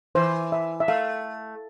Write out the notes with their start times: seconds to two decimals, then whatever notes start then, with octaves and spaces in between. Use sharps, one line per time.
0.15 E3 C5
0.52 E5
0.80 E5
0.88 A3 F5